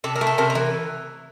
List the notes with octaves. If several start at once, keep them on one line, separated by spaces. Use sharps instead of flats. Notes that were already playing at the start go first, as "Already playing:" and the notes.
C3 A4
A#4
A3
A4
C3 A#4
A#4
E3